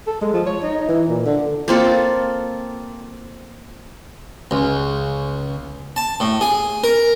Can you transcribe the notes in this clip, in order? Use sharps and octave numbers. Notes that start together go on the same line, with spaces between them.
A4
G#3
F3
C#5
D#4
E3
A#2
D3
A#3 C4 F4 A4
C#2
A5
A2
G#4
A#4